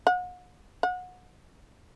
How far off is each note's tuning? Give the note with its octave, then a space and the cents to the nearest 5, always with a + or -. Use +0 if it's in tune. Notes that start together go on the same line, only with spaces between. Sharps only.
F#5 -40
F#5 -25